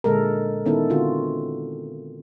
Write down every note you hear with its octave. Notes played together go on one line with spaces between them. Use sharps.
A#2 D3 G#3 A4 A#4
D#3 B3 C#4 D#4 E4 A4
D3 C4 F4 F#4